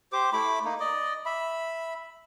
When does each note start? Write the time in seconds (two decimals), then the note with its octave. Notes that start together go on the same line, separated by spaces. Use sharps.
0.12 G4 C5 D6
0.33 A3 E4 B5 D6
0.65 A#3 D#4
0.80 D5 D#5
1.26 E5 B5